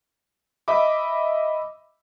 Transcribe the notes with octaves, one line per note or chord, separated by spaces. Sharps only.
D#5 E5 B5 D6